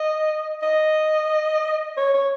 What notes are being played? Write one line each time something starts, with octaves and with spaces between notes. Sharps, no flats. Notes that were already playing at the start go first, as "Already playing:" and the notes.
Already playing: D#5
D#5
C#5
C#5